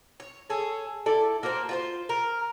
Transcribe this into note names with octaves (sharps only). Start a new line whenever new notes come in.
C#5
G#4 A4 C#5
E4 A4 D5
A#3 F#4 A#4 C5
F4 F#4 C5
A#4